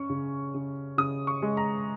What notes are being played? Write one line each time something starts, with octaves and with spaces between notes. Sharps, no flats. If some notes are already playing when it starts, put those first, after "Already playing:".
Already playing: C#4 C#6
C#3
C#3
C#3 D#6
C#6
G#3
A#5